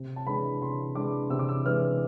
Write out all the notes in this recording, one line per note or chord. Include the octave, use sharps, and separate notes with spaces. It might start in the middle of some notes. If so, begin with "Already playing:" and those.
Already playing: C3
A5
E3 G#3 D4 B5
C3 C6
E3 G#3 D4 D6
C3 E6
D6
E6
E3 G#3 D4 F6